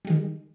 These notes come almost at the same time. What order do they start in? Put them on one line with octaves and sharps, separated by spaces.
G3 G#3 D#3